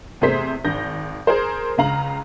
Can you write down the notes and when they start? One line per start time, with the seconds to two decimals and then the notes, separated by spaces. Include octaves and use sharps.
0.21 E2 C3 A3 G#4 C5 B6
0.64 G#1 G6 A#6
1.27 G#4 A#4 C5
1.78 C#2 C#3 F5 A#5 F#7